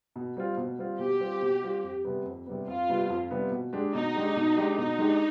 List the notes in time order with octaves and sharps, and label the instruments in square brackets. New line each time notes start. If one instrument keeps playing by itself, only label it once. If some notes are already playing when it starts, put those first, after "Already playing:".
[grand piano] B2
G3 C4 F4
B2
G3 C4 F4
[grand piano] B2 [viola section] G4
[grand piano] G3 C4 F4
B2
G3 C4 F4
F2
C3 G3 B3
F2
C3 G3 B3
[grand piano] F2 [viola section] F4
[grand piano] C3 G3 B3
F2
C3 G3 B3
B2
G#3 D4 G4
[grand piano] B2 [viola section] D#4
[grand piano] G#3 D4 G4
B2
G#3 D4 G4
[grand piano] B2 [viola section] D#4
[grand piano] G#3 D4 G4